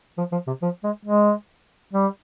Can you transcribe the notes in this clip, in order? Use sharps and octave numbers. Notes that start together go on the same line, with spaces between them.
F3
F3
C3
F3
G#3
G#3
G3